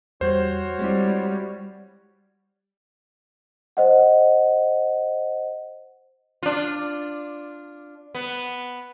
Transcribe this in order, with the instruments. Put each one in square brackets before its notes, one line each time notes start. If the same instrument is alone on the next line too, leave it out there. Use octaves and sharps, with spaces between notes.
[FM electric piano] E2 G3 G6 [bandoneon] F#4 C#5 F6 [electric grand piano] C5
[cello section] G3 [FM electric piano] G#3 C4 E4
[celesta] C5 D#5 F#5
[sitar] D4 F4
B3